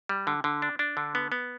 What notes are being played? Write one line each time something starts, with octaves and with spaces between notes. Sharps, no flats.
G3
D3
D3
D4
D4
D3
B3
B3